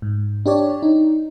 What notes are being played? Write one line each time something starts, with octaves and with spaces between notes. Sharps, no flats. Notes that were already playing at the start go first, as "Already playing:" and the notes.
G#2
D4 G4 C#5 D5
D#4